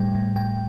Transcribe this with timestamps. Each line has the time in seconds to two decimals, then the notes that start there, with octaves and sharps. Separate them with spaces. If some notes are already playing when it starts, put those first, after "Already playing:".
Already playing: A2 G3 G5
0.15 A2
0.36 A2 G5